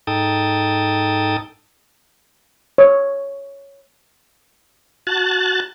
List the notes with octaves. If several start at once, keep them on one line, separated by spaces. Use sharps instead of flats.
G#2 D#4 A4 G5 A5 D#6
C#5
F#4 A5 F#6 A6